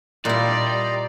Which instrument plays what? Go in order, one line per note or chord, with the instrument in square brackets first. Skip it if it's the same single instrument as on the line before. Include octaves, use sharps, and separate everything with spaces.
[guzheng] A#2 E4 [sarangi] G3 [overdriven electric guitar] D5 [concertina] D#5 A#5 C6